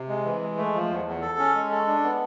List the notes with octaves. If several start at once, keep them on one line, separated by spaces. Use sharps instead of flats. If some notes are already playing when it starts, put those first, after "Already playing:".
Already playing: C3
G#3
E3
G#3
A3
F3
E2
E2
A4
C#4
G#3
A4
D4
B3